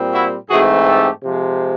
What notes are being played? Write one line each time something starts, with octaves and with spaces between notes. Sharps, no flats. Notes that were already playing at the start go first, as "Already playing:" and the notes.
Already playing: A#2 G3 C4
E4 F#4
G#2 E3 A3 C4 F#4 G#4
G4 A4
C3 F3 G#3